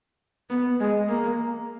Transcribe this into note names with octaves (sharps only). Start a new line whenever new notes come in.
B3
G#3
A#3